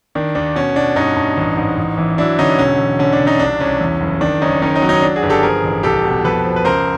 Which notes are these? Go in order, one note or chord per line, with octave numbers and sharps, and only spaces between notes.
D#3 D4
D#2 D4
B2 C#4
B2 D4
G2 C#4 D#4
G2
A1
G#2
A1
E3
F#3 D4 E4
D3 C#4 D#4
E1 C#4
E1
D3 C#4
D4
D3
C#4 D#4
C2 D4
C2 C#4
E2
F#1
D#3 D4
F#1 C#4 D#4
D#3 C#4 D#4
C#4 D#4
F#3
C#4 D#4
F#3 D4
F#4 G#4
G1
G4 A4
F3 G#4 A#4
A1
C2 G4 A4
B2
F2 A4 B4
F3
B4
C#2 A#4 C5